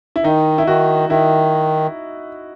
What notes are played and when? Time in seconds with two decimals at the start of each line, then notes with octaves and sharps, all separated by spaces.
0.16 E4
0.24 D#3 D#4
0.58 E4
0.67 D#3 F#4
1.09 D#3 E4